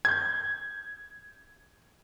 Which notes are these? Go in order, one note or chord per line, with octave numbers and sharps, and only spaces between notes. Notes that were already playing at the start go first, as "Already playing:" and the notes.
G6 G#6